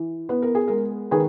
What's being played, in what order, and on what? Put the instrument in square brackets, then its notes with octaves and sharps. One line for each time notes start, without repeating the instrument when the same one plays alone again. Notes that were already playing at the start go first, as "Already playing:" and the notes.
Already playing: [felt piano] E3
B3 B4
A#4
G#4
G#3 A#4
D#3 G#4 B4